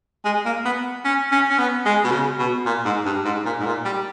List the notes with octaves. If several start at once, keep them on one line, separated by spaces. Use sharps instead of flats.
G#3
A#3
B3
C#4
C#4
C#4
B3
G#3
B2
C#3
B2
A#2
G#2
G2
G#2
A#2
G#2
A#2
G3